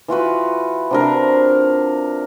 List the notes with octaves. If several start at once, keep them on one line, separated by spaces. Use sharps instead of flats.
E3 F4 F#4 B4
C3 D4 A#4